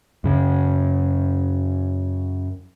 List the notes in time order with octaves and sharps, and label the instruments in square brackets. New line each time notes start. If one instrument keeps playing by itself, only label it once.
[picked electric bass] F#2 C#3